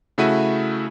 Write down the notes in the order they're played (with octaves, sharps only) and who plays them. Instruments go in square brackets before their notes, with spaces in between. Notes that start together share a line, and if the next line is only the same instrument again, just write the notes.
[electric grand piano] C#3 A3 E4 F#4 E5 D#7